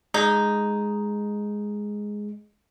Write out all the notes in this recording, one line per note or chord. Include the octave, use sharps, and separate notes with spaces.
G#3 D#4